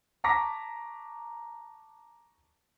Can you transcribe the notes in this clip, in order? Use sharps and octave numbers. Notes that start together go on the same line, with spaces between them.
A5 A#5 C#6 D6 A#6 B6